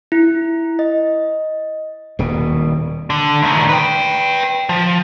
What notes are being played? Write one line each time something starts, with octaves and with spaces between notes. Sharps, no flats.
E4
D#5
D#1 B2
D3
D2 D#3
B4 G5
F3